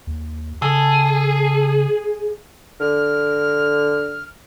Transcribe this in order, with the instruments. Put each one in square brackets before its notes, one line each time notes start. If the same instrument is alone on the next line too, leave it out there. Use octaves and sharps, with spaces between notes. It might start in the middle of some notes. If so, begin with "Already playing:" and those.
[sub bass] D#2
[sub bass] C#3 [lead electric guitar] G#4 [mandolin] A4 D#6
[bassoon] D3 [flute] F6